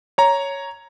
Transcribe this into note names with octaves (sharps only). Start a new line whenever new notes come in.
C#5 A#5